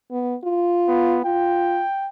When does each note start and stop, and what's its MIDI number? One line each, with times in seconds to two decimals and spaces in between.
0.11 0.35 59
0.44 1.19 65
0.88 1.24 59
1.24 1.83 65
1.24 2.09 79